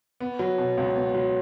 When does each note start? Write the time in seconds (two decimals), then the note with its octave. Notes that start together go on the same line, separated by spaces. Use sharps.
0.20 B3
0.39 F#3
0.58 B2
0.77 C#2
0.96 B3
1.15 F#3